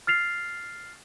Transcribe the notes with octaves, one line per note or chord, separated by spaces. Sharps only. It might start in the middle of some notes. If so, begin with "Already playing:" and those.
F6 A6 C7 F7